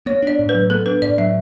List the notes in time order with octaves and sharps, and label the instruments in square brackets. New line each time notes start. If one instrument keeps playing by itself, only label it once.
[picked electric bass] B3 [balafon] C#5
[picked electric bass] D4 [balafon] D5
[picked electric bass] A2
[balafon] B4
[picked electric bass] F#3
[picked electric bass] B3 [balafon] A4
[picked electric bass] D4 [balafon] B4
[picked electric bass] A2 [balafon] D5
[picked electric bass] F#3 [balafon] E5